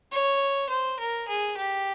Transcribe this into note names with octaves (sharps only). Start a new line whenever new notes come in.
C#5
C5
A#4
G#4
G4